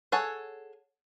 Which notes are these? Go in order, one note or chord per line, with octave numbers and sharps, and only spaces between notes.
G#4 A4 C#5 F#5